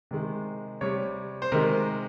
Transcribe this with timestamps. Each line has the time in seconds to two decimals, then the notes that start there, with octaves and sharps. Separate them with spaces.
0.11 C3 D#3 G#3
0.81 C3 G3 C#5
1.42 C5
1.52 C3 D#3 G#3 A#4